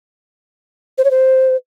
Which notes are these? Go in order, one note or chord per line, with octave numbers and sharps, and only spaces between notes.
C5
C#5
C5